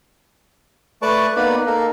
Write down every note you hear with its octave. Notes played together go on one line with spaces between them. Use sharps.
A3 B4 D5 A5 C#6 D6
A#3 B3 D#4 B4 D5 B5
A#3 D#4 A4 A#4